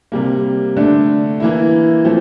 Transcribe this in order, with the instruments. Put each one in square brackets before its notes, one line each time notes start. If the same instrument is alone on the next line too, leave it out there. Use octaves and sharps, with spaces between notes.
[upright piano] C3 G3 A#3
D3 A3 D4
E3 A#3 E4
F3 A3 C4